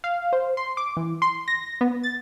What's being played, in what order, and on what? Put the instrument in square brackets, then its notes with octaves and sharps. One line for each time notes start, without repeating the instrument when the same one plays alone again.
[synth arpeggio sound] F5
C5
C6
D6
E3
C6
A#6
B3
A6